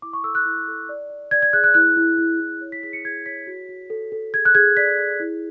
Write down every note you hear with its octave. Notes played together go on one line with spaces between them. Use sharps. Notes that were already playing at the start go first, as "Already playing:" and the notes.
E4 D6
C#6
A4 E6
F#6
E4
A4
D5
D5
D5 G#6
G#6
G#4 F#6
F#6
E4 F#6
E4
E4
E4
C#5
B6
G#4 B6
C#7
G#4 G#6
C#5 B6
F#4
F#4
A4
A4
G#4 G#6
F#6
G#4 G#6
D5 B6
G#4
E4